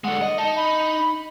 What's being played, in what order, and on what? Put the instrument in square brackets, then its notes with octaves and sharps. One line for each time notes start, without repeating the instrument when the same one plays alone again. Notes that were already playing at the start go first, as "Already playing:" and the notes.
[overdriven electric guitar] D3 G#3 [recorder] F#5
[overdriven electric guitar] D#5
[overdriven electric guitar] D#4 [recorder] A5
[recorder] B5